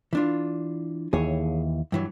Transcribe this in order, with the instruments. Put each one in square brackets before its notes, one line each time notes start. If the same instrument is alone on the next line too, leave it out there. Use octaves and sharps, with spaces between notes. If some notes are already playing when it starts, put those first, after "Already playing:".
[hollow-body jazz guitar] E3 D4 F4
[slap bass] D#2 E3 [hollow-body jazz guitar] G#4 C#5
[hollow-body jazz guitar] G2 E3 F#3